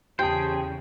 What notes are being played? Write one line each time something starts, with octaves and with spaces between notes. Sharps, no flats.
E2 C#3 G4 G#4 C5 G5 A5